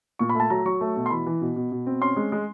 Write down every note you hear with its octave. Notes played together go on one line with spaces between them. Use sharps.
A#2 C#6
B5
A3 A5
F#3 A#5
F#3 C#6
A3
B2
C6
E3 B5
E3
B2
B2
B2
C4
C#4 C6
G#3
G#3